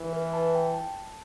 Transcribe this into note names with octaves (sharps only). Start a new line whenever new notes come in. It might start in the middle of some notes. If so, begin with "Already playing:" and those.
Already playing: E3
B4
A5
G5
A5